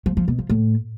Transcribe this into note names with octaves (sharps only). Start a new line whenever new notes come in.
F3
F3
B2
F3
A2